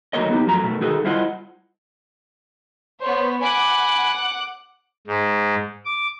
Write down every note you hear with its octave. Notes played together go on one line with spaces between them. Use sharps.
D#3 F#3 A3 A#3 C#5 D#5
B3 D#4 G4
F#2 F3 F#3 A3 A#5
B2 A3
D#3 D#4 F#4 G#4 A4
G3 E4 F4 C5 D#5 F#5
B3 C5 C#5
F#5 G#5 B5 D6 F#6
G#2
D6